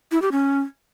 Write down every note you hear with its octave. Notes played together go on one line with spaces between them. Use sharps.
E4
G4
C#4